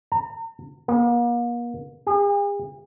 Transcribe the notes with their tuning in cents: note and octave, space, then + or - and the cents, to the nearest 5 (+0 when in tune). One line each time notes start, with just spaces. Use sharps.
A#5 -40
A#3 +40
G#4 -45